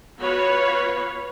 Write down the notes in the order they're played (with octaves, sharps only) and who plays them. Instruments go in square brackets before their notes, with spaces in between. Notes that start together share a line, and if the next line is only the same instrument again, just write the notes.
[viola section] B3 F4 F#4 B4 C#5 F5